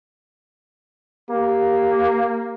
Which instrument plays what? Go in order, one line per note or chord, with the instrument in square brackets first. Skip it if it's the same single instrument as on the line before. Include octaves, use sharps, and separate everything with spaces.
[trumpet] A#3 [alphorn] G4